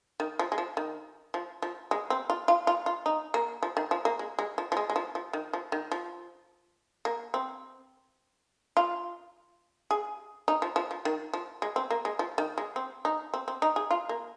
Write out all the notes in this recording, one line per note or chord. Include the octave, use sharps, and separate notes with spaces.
D#3
F3
G#3
F3
D#3
F3
F3
G#3
C4
F4
F4
F4
F4
D#4
A#3
F3
D#3
F3
A#3
G#3
G#3
F3
F3
G#3
G#3
F3
F3
D#3
F3
D#3
F3
A#3
C4
F4
G#4
D#4
F3
F3
F3
D#3
F3
G#3
C4
A#3
G#3
F3
D#3
G#3
C4
D#4
C4
C4
D#4
G#4
F4
A#3